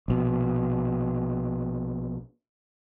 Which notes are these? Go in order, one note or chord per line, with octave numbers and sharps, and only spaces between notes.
A#1 B2